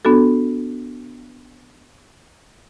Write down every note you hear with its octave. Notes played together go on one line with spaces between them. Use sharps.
B3 D4 F#4 A4